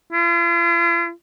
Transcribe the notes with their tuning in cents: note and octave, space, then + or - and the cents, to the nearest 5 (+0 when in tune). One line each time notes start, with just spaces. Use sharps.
F4 -45